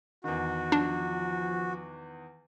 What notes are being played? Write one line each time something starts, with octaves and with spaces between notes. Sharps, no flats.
E2 D#3 F#4
F3 D4